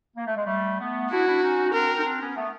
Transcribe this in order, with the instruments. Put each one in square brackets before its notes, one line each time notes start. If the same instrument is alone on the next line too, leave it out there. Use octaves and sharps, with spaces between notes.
[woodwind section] A#3
A3
G#3
G3 A3
A3 B3
[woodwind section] D4 E4 [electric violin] F#4
[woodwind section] D4 E4
C#4 D#4
C#4
[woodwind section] C4 D4 [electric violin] A#4
[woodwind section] D#4
C4 D4
B3 C#4
A3 B3